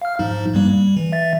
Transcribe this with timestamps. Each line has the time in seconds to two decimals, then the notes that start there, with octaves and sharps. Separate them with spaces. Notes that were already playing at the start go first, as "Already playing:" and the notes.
0.02 F5 F6
0.19 G#2 F3 D#4
0.53 G2 G3 A#3
0.70 G3
0.97 E3
1.12 E3 E5 A6